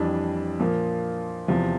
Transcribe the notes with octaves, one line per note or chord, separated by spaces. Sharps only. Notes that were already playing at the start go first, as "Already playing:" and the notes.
Already playing: F2 E3 G3 D4
A#2 F3 A#3
E2 C3 F3